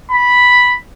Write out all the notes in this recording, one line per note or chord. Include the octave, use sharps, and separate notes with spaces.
B5